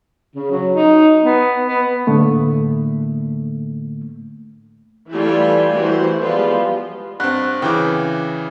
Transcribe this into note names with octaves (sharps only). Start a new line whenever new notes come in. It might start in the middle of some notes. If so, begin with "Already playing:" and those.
C#3
F#3
D#4
B3
B3
A2 D3 A3 A#3
E3 G3 A3 F4 G5 G#5
E3 A3 F#4 G4 C5
F3 G3 G#3 B3 F4 B4
G2 C4 F#5
C#3 E3 G5 D6